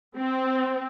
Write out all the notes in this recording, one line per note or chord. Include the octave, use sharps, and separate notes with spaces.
C4